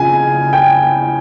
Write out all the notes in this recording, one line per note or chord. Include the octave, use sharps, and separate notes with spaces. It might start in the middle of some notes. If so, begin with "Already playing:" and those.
Already playing: C#3 F3 G#5
G5